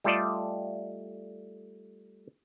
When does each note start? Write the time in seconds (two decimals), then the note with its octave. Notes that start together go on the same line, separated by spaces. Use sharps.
0.04 G3 A3 F4 A4 D5 D#5